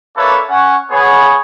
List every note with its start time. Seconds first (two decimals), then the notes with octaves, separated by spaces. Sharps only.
0.17 A#3 D4 A4 B4 C#5 E5
0.49 C#4 F#5
0.91 B3 G#4 C#5